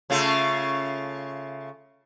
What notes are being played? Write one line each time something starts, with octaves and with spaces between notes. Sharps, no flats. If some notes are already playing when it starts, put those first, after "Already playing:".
C#3 A3 F4